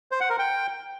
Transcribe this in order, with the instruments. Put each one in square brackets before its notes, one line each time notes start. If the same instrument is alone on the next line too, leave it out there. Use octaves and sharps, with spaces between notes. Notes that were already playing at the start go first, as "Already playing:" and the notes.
[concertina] C5
F#5
A#4
G5